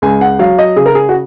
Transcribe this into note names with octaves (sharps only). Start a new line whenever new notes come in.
C#2 G#5
F#5
F#3 F5
D#5
C#3 G#4
A#4
G#4
F#4